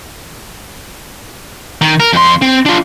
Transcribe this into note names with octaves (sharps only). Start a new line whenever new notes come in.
D#3
A#4
F2 C6
C4
D4 F4